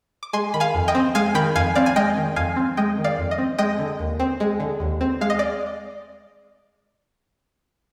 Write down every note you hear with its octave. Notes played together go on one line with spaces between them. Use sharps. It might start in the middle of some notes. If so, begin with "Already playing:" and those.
D6
G#3 G#5 C6
D#3 B5
F5 G#5
F2
D#5 G5
C4
G#3 F5 G#5
D#3 G5 B5
F2 F5 G#5
C4 D5 F5
G#5
G#3 D#5 G5
D#3
F2 F5 G#5
C4
G#3 D#5 G5
D#3
D5 F5
F2
D#5
C4
G#3 D#5 G5
D3
D#2
C4
G#3
D3
D#2
C4
G#3 F5
D#5
D5